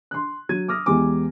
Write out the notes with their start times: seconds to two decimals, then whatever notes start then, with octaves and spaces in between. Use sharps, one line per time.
0.11 C6 F#6
0.49 F#3 G#6 D#7
0.68 D6 D#6 F6 A#6
0.86 E2 E3 G#3 G4 G#5 D6